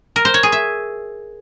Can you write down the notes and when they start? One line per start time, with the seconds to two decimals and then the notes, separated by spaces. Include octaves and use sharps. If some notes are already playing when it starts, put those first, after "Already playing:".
0.16 A#4
0.25 C5
0.34 C#5
0.43 G#4
0.52 E5